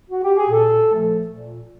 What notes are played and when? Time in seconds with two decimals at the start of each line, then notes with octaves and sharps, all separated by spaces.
0.10 F#4
0.23 G4
0.37 G#4
0.50 A#2 A4
0.89 F3 A3
1.28 A#2